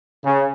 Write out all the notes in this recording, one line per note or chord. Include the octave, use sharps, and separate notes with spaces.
C#3